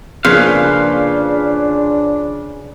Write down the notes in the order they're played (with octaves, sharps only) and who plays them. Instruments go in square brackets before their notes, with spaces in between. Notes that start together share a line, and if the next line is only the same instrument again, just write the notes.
[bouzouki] C#3 [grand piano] F3 A#3 [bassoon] D4 [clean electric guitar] B4 C5 F5